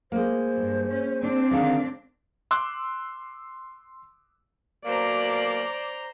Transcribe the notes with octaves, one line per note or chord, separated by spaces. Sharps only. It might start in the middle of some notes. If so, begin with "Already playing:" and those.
G#3 A#3 C5
G2
C#4
C4 D4
D3 D#3 G#3 F5
C6 D6 E6 F#6
B2 F#3 A#3 C5 D5 A#5